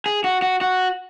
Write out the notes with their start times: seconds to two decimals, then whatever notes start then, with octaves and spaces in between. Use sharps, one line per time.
0.06 G#4
0.24 F#4
0.42 F#4
0.61 F#4